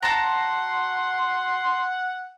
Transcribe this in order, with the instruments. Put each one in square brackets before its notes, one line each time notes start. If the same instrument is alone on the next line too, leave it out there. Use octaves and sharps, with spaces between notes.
[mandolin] F#4 A5 A#5 [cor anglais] F#5 [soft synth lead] C6